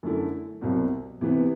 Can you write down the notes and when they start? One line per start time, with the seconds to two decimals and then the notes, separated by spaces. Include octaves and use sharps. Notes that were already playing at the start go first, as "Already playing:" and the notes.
0.03 F#2 D3 A3 E4
0.61 C2 B2 F#3 C4
1.21 C3 E3 B3